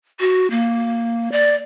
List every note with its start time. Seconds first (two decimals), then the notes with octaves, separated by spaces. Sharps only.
0.20 F#4
0.51 A#3
1.32 D5